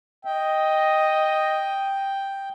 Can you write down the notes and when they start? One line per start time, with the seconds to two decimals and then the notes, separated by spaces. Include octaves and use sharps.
0.25 D#5 G5